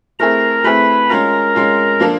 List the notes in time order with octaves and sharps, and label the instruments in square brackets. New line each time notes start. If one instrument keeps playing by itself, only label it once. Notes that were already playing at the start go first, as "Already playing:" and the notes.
[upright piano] A3 C4 E4 G#4 [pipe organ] A#4 A#5
[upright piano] A3 C4 E4 G#4 [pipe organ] B4 B5
[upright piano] G#3 C#4 F4 [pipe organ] A#4 A#5
[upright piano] G#3 C#4 F4
F3 A#3 D4 F4 A4